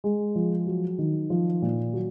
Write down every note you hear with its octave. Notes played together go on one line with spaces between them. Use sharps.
G#3
F3
F#3
D#3
F3
A#2
F#3